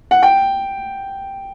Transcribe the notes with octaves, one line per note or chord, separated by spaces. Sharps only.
F#5
G5